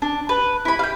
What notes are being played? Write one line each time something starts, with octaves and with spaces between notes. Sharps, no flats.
D4
B4
E4 B5
F5 G5